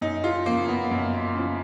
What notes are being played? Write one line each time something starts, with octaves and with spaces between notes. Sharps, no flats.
F#2 D#4
F4
C#3 F3 A#3
B3
F#2
C#3 F3